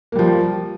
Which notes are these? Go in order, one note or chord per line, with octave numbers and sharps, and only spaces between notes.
F3 G3 A#3